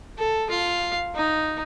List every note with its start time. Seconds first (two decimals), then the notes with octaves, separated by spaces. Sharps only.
0.18 A4
0.50 F4 F5
1.15 D#4